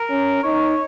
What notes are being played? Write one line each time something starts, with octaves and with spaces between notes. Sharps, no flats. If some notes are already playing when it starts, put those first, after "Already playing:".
Already playing: A#4
C#4
D#4 C#5